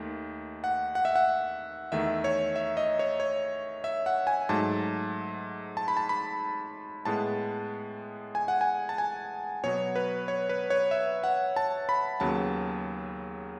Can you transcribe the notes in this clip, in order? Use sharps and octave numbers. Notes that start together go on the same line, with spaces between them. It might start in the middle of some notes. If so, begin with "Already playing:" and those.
Already playing: D#2 D#3 A3
F#5
F#5
E5
F#5
E2 D#3 A3 E5
C#5
E5
D#5
C#5
C#5
E5
F#5
G#5
G#2 F#3 A3 A5
A5
B5
A5
B5
A2 G#3 B3 A5
G#5
F#5
G#5
A5
G#5
B2 F#3 B3 C#5
B4
C#5
B4
C#5
E5
F#5
A5
B5
D#2 C#3 F#3 B3 A5